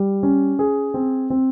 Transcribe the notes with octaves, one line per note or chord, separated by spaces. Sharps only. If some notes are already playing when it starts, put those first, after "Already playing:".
Already playing: G3
C#4
G#4
C4
C4